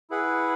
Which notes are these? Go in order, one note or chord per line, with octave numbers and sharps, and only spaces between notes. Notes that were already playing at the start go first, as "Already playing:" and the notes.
E4 G#4 B4 F#5